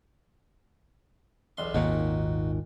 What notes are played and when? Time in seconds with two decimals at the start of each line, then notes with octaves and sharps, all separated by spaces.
1.57 B1 E2 C6
1.74 G#1 D#2 A#2 D#4 F#4